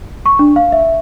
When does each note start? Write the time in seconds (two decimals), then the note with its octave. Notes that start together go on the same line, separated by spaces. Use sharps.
0.26 C#6
0.39 D4
0.56 F5
0.72 E5